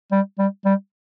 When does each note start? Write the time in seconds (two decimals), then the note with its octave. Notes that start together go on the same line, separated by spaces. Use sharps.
0.12 G3
0.39 G3
0.65 G3